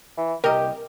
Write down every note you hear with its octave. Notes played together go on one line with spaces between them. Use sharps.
E3
C2 G4 A#4 D#5